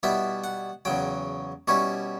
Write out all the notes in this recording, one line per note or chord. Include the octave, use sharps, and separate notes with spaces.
B2 G3 B3 E4 E5
F#5
E2 C#3 F#3 G5
B2 G3 C#4 E4 C#6